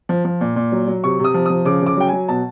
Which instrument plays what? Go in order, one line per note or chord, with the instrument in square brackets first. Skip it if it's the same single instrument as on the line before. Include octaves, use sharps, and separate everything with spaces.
[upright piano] F3
F3
A#2
A#2
F#3
F#3
C3 C#6
C3
D#6
F3
F3 D#6
C#3 D6
C#3
D6
F#3 G5
F#3 G#5
B2 A5